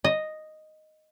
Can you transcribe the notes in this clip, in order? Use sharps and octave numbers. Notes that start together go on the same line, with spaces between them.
D#5